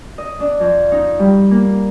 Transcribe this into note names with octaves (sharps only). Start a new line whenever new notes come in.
D#5
D4
F2
D#4
G3
A#3